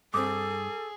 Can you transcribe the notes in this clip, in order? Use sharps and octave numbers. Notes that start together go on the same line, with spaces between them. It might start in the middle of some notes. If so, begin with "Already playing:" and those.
G2 C4 G#4 A4 D6 D#6